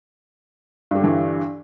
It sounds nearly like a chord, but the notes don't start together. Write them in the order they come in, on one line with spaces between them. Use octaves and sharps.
G2 G3 D3 E3